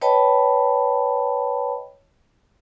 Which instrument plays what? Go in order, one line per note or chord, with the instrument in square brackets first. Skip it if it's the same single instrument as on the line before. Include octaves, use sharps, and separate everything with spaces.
[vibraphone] B4 C#5 D#5 G5 A5 B5